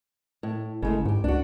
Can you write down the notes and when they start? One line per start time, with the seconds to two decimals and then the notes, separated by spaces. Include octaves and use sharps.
0.43 A2
0.82 G1 C#3 G#3 A3
1.05 G#2 F#4 G4
1.24 C#2 D4 F#4